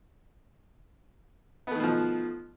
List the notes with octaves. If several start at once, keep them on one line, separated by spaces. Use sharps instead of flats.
B2 D#3 F3 A3 B3